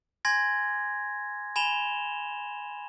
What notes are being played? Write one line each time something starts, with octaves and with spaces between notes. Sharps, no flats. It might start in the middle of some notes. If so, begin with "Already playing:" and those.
G#5 C6 G#6 A#6
G#5 B5 E7 F7 G7